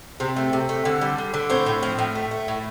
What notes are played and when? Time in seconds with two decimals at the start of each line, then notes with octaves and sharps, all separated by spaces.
0.20 C3 C4
0.36 A3
0.53 C3
0.69 A3
0.85 D3
1.01 G3
1.18 D3
1.34 D3
1.50 A2 C4
1.66 A2
1.83 F3
1.98 A2
2.15 A3
2.31 A3
2.48 A2